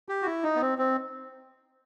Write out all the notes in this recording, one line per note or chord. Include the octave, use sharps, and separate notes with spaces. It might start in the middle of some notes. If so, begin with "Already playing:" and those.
G4
F#4
E4
D#4
B3
C4
C4